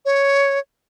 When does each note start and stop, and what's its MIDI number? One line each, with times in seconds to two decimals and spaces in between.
0.05 0.59 73